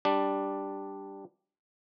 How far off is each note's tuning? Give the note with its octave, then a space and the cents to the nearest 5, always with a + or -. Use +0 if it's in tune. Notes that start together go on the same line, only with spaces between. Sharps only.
G3 +0 D4 +0